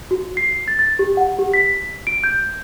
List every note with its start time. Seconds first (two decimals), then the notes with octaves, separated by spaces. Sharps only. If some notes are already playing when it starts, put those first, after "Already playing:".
0.11 F#4
0.37 C7
0.68 A6
0.79 A6
0.99 G4
1.17 F#5
1.39 G4
1.54 B6
2.07 D7
2.24 G6